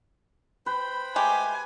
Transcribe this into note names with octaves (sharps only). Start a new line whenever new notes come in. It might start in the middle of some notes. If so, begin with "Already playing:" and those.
B4 C5 G5 B5
G#3 A3 G4 G#5